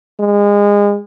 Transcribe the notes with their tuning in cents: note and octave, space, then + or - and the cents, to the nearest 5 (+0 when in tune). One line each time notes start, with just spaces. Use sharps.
G#3 -30